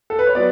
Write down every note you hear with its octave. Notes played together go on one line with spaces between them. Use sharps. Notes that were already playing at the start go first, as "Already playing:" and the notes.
A4
B4
C#5
F#3 B3 D5